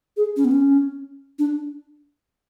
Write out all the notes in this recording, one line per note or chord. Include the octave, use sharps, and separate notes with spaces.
G#4
C#4
B3
C#4
D4